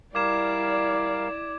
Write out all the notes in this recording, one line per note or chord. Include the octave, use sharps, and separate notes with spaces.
G3 E4 A#4 D5 F5 D6 G#6 E7